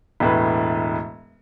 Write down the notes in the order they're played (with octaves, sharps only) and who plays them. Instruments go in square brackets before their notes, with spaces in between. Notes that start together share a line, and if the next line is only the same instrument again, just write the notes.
[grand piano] E1 A2 B4